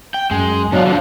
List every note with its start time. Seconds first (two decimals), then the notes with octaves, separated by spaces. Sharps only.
0.14 G5
0.31 F#2 G#3
0.72 B2 F#3 D4 F4
0.86 D3 F3